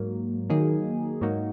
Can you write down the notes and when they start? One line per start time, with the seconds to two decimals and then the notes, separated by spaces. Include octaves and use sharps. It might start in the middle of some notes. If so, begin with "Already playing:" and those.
Already playing: G#2 F#3 A#3
0.50 D#3 F#3 A#3 D#4 G#4
1.21 G#2 F#3 A#3 D#4 F#4